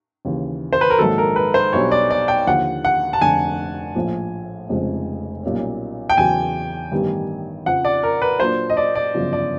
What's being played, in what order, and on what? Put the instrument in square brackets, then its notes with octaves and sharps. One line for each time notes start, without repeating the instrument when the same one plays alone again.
[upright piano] D#2 C#3 E3
[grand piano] C5
B4
A#4
[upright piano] A#1 G#2 D#3 F#3 [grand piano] A4
[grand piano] A#4
B4
C5
[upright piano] B1 B2 G3 B3 D4 [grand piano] C#5
[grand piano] D5
D5
G5
[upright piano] D#2 D3 F3 [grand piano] F#5
[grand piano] F#5
A5
[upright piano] F1 F2 D3 [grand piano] G#5
[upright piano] A#1 A2 F3
F1 F2 C#3 F3 G#3
B1 A#2 G3 A#3 C#4
[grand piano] G5
[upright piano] E2 C#3 F#3 [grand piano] G#5
[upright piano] A1 G2 D#3 G3 B3
[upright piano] F2 C#3 F3 [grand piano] F#5
[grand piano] D5
A#4
B4
[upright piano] A#2 F#3 A#3 D4 F4 [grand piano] C5
[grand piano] D#5
D5
D5
[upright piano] G1 F#2 C#3 F3
[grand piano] D5